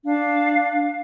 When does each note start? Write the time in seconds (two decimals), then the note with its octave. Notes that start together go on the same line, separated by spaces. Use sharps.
0.05 D4 F5